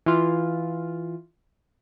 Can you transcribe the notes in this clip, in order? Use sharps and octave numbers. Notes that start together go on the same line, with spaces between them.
E3 F4